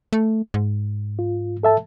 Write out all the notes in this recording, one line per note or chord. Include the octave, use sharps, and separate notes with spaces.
A3
G#2
F4
A4 E5 A5